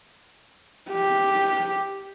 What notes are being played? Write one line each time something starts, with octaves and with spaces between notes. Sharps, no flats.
G4